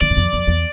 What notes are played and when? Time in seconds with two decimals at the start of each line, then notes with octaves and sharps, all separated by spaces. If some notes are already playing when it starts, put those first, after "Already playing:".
0.01 D3 D5
0.10 G2
0.17 F2
0.33 F2
0.47 E2